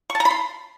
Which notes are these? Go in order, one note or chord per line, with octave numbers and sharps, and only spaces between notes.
C#6
A5
A#5
B5
C6